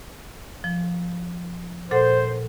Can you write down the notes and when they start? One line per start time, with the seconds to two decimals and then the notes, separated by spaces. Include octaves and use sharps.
0.64 F3
1.91 A#2 A4 C5 F#5